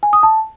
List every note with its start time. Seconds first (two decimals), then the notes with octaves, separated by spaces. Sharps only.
0.03 G#5
0.13 D#6
0.23 A5